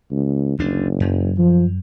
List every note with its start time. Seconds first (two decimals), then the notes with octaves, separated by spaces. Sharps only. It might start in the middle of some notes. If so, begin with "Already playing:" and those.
0.11 C#2
0.59 F#1 D2 D4
1.00 F#2
1.38 F3